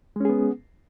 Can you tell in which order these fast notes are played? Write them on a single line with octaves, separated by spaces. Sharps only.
G#3 C#4 G#4 B3